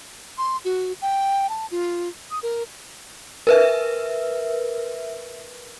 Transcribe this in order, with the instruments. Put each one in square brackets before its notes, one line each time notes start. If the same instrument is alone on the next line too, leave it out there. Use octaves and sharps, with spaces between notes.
[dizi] C6
F#4
G5
A5
F4
D#6
A#4
[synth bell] A#4 B4 E5